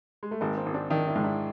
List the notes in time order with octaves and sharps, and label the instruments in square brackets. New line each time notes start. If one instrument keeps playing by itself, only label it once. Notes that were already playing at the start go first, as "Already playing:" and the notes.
[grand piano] G#3
A3
[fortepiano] G#1 [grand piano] G#3 A#3
[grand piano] A#3 C4
[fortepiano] G#1
[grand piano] C4 D4
[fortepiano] D#3 [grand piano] D4 E4
[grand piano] D4 E4
[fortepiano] G#2
[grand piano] D4 E4